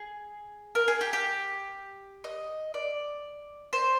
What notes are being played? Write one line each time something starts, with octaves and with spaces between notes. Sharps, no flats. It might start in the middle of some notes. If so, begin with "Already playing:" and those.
Already playing: G#4
A#4
G#4
G4
G4
D#5
D5
C5